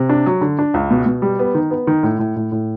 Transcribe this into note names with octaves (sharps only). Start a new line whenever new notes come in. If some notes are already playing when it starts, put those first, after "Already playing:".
Already playing: C3
D4
F#3
D3
D4
C#2
B2
B2
G3
B3
D#3
B3
D#3
A2
A2
A2
A2